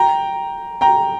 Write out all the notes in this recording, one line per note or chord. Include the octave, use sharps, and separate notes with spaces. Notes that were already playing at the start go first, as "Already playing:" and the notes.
Already playing: G5 A#5
G5 A#5